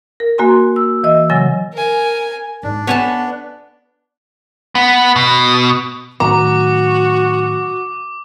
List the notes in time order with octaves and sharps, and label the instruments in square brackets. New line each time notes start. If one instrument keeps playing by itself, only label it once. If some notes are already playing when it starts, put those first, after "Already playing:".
[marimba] A#4
A#3 F#4 G#5 C6
E6
E3 D#5 E6
C#3 F#3 G#5 A#6
[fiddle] A#4 G#5
[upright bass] G#2 G#3 [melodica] D4
[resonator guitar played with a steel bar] B3 [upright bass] F4 [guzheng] C#5 G#5 A5
[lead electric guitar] B3
B2
[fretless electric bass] A2 D#3 F#3 [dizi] F#4 [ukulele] A#5 [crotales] D6